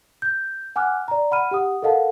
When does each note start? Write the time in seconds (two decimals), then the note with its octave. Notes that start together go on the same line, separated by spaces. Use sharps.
0.22 G6
0.76 F#5 G#5 D6 F6 F#6
1.08 D5 A#5
1.31 F#5 B5 F6 D#7
1.51 G4 F#5 D#6
1.82 A4 A#4 D#5 F5 F#5 A5